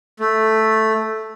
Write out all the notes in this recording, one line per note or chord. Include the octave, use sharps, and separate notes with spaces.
A3